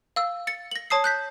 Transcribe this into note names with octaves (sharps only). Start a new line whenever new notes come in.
F5 E6
A6 C#7
A#6 F#7
C#5 A5 D#6 C7
F#6 G6 B6